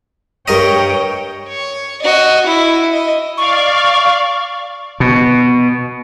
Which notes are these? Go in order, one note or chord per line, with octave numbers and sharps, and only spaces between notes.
G2 A#4 C#5 D#5 G5
C#5
F#4 D#5
E4
D#5
D5 F5 C#6
B2